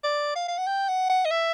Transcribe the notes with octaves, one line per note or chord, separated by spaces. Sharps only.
D5
F5
F5
F#5
G5
F#5
F#5
D#5
E5